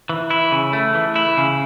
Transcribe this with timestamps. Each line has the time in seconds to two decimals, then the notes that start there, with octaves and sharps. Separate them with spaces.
0.09 E3
0.30 E4
0.52 C#3
0.73 A3
0.94 E3
1.16 E4
1.37 C#3